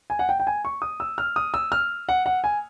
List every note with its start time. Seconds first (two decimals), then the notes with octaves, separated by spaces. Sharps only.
0.10 G#5
0.19 F#5
0.29 G5
0.40 G5
0.47 G#5
0.65 C#6
0.82 D#6
1.00 E6
1.18 F6
1.36 D#6
1.54 E6
1.72 F6
2.09 F#5
2.26 F#5
2.44 G#5